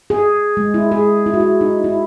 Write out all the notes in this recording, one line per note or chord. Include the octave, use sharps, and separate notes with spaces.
G#4
G#3
E4
G#4
E4
F#4
E4
D#4
E4